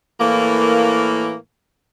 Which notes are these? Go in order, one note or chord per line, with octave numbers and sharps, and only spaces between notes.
A2 E3 A#3